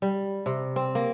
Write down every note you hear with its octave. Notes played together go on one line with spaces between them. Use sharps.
G3
C3
C4
A#3